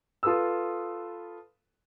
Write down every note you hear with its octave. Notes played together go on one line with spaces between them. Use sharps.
F4 A4 B4 D#6 E6